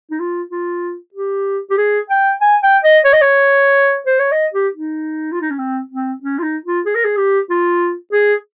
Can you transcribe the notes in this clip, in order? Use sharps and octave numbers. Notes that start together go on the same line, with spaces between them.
D#4
F4
F4
G4
G4
G#4
G5
G#5
G5
D#5
C#5
D#5
C#5
C5
C#5
D#5
G4
D#4
F4
D#4
C#4
C4
C4
C#4
F4
D#4
F4
G#4
A#4
G#4
G4
F4
G#4